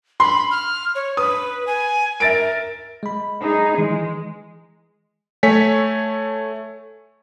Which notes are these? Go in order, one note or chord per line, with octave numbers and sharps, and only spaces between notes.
B5 C6
F6
C#5
B4 D#6
G#5
A#4 E5 A6 D7
G#3 B5
D#4 G#4
D#3 E3 G#3
A3 C#5 G#5 B6